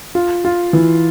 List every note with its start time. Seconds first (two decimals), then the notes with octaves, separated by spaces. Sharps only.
0.15 F4
0.45 F4
0.73 E3